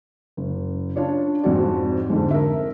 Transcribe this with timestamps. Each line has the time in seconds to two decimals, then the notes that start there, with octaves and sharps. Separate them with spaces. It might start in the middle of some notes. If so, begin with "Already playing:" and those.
0.37 F#1
0.96 D4 F4 C#5 D5
1.43 F2 G#2 C3 F#4 D5
2.10 F2 G#2 D3
2.31 A#4 E5